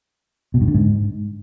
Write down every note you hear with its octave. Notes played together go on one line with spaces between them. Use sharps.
B2
G2
D3
G#2